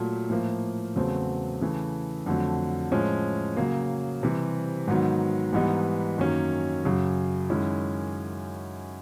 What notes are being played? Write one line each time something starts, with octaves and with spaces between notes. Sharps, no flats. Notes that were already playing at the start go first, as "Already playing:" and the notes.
Already playing: A#2 F#3 A3
A2 F3 A#3
E2 C#3 F#3 A3 C4
C#3 E3 A3
F2 D3 F#3 A3
A2 F3 G#3 C#4
C#3 F#3 A#3
C3 E3 G3
G#2 D#3 F#3 B3
G#2 E3 G3 B3 D#4
F#2 D#3 F#3 A#3 C#4
F#2 C#3 F#3
F#2 D#3 G#3 C#4 E4